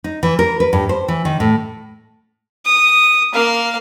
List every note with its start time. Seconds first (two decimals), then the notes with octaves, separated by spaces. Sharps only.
0.04 D#4
0.23 E3
0.39 A#4
0.60 B4
0.73 G2
0.89 C5
1.08 E3
1.25 D#3
1.40 A2
2.66 D#6
3.33 A#3 F5